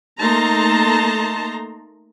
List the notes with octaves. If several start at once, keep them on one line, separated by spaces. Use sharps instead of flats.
A3 A#3 D#4 A5 A#5 C6